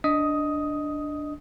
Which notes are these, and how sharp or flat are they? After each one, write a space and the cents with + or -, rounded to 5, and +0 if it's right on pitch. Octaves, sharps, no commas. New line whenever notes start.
D4 +0 D#5 +0 D#6 +10